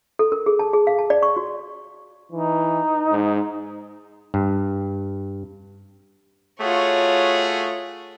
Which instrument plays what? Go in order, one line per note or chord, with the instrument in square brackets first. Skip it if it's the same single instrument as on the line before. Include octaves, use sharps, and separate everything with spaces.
[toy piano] A4
A#4
G#4
A5
G#4
F5
A5
D5
C#6
F#4
[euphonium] E3 [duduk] D#4
[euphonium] G#2
[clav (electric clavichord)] G2
[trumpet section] A3 F#4 G#4 [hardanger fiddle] F4 C#5